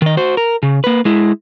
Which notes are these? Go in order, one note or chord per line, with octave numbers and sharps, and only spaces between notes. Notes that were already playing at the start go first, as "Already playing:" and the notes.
D#3 D#5
F#4 C5
A#4
C#3
A#3 B4
G#3 E4